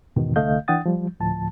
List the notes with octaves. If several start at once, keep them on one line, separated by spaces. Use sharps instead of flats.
E2 G#2 B2 D#3
C2 D3 A3 D#5 F5 G6
E3 D4 F#5 G5 D#6 A6
F3 G3
D2 A2 F3 A5